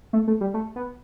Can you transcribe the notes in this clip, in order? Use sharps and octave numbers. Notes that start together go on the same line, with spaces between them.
A3
A3
G3
A3
B3